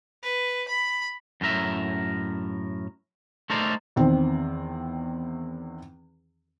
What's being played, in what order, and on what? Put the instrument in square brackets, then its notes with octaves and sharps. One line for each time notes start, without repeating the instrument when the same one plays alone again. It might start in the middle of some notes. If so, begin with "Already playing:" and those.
[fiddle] B4
B5
[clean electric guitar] F#2 A2 A#4 E5
A3 D#4 A4 A#4 C5 D5
[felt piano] E2 D#3 C4